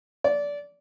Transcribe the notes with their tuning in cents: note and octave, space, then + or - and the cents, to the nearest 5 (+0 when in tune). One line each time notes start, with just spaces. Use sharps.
D5 -20